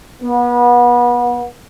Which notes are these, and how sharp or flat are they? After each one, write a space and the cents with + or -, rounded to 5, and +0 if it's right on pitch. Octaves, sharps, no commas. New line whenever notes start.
B3 -30